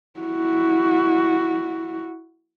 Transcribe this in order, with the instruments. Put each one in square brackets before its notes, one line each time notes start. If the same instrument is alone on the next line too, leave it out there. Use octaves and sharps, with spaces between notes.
[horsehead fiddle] E4 F#4